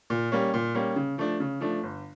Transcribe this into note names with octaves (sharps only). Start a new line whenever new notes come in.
A#2
G3 A#3 C#4
A#2
G3 A#3 C#4
C#3
F3 A3 D4
C#3
F3 A3 D4
G1